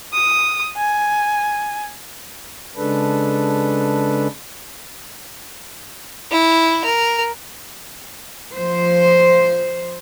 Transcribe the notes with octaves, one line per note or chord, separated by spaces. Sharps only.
D#6
G#5
C#3 G#3 D4 A4 B4
E4
A#4
F3 C5